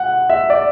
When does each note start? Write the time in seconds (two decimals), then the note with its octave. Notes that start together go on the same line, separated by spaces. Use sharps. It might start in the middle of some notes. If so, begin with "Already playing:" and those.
Already playing: F#5
0.30 E5
0.50 D5